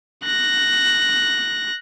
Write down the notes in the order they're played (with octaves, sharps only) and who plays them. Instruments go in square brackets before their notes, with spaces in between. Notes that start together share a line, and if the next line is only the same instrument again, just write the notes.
[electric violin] F#6 A#6